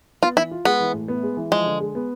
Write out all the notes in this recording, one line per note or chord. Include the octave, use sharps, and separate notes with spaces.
B3 F4
E3 E4
F4
G#3 B3
E3
A2
B3
G#3
E3
F3 G#3
D3
G#3
B3